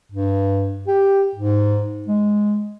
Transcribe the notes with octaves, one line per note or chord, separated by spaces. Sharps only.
G2
G4
G#2
G#3